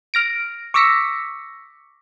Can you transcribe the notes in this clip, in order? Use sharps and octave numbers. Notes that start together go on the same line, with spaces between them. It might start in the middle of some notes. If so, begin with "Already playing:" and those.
F6 A#6 D7
C#6 D6 E6 A#6 B6 C#7